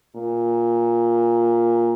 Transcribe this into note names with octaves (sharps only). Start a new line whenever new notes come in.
A#2